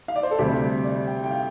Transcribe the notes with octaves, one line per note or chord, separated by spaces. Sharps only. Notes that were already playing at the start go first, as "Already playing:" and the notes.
F5
D5
C5
A4
D2 C3 G3 G4
D5
G5
G5
F5